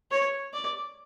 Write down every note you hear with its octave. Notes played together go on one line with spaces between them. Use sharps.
C#5
D5